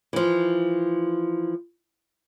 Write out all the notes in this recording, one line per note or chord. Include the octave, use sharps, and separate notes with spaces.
E3 F3